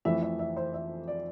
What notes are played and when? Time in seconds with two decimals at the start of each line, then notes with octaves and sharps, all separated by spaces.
0.05 F2 E3 A3 E5
0.22 E5
0.39 E5
0.57 C5
0.74 E5
1.08 D5